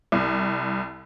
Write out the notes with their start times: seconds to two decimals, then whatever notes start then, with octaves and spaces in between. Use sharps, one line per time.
0.12 C2